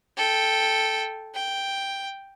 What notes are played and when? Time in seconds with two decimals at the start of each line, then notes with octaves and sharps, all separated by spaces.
0.17 A4 G5
1.35 G5